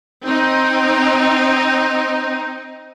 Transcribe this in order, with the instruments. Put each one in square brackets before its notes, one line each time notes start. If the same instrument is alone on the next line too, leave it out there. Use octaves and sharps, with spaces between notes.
[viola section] C4 D#4